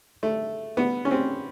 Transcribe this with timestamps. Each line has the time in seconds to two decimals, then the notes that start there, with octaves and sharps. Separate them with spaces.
0.23 A3
0.77 B3
1.05 C#4
1.11 C4